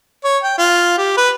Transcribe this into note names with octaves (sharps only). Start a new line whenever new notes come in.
C#5
G5
F4
G4
B4